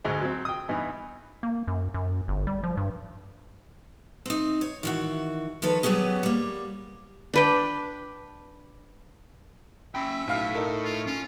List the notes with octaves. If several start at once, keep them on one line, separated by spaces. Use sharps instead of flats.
D2 G#2 G#3 G#5
F#3 C4
G5 D#6
G2 E3 B3 D#4
A#3
F#2
F#2
G1
G3
F3
G2
C4 D#4
C#5
D#3 E3 F#4
D#3 F3 A4 B4 C#5
F#3 G3 B3 C#4 G#4
G3 A#3
D4 B4 G5
C#4 E5 G5 B5
B1 A2 F5 F6
D#4 A4 A#4
F4
C#4 F4